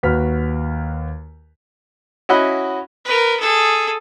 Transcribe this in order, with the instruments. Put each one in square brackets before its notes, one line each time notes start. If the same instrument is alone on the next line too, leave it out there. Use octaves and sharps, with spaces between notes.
[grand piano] D#2 F#4 B4 F6 B6
[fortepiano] C#4 E4 F#4 D#5 F#5 B5
[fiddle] A#4 B4
G#4 A4